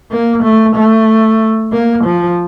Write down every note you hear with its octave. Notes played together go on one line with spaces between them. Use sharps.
A#3
A3
A3
A#3
F3